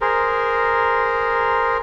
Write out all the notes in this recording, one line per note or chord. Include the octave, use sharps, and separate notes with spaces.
G#4 A#4 C5